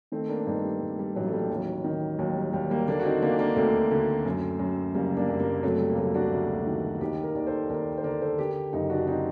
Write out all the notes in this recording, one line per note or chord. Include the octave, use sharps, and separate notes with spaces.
D#3 A3 C4
A#3 D4
D4
G2 C4 D#4
G3
G2
G3
A1 F#3
A3
G3
D#2 F#3
D#3
D#2 F#3
G3
D#2 G3
G3 A#3
D3 A#3 D4
F#4
C4 D#4
D3 A#3 D4
A#3 D4
D2 A3 C4
D3
F#2
F#2
F#1 G3 A#3
A#3 D4
F#1
G3 A#3
C3 F#3 A3
G3
A#3
D2 F#3 A3
D4 F#4
D2
D#3
D#2 D#4 G4
G4 A#4
D#2 D5
A4 C5
D#2 A#4 D5
C5
D3 A#4 D5
A4 C5
D3 G4 A#4
F#1 D#4 G4
D4 F#4
C4 D#4